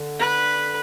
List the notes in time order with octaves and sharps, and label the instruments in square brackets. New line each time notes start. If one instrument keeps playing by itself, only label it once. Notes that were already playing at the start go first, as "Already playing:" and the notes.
Already playing: [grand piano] D3
[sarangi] B4